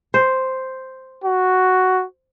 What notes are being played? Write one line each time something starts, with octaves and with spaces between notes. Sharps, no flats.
C5
F#4